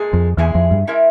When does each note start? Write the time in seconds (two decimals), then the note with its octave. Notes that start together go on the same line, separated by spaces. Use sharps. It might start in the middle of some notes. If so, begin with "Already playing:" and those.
Already playing: A#2 G#3 G#4
0.13 F2
0.37 E2 A#2 G#3 E4 G#4
0.55 F2
0.71 G2
0.87 G#3 E4 A#4 E5